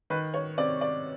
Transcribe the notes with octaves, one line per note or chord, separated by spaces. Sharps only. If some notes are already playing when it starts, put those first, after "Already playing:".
D#3 B4
C#5
C3 D5
D5